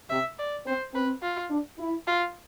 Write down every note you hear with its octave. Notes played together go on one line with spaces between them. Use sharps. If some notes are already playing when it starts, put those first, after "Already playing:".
C3 E5
D5
C4 C5
C4 B4
F4
D4
E4
F4